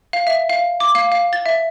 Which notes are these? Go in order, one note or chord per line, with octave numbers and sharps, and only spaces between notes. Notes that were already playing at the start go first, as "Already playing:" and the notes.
F5
E5
F5
D6
F5
F5
A6
E5